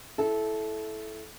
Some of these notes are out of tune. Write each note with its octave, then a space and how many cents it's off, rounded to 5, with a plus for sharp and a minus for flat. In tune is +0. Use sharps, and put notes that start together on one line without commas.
E4 +0 A4 -20